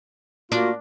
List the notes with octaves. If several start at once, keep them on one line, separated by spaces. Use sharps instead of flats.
A#3 D4 F4 F#4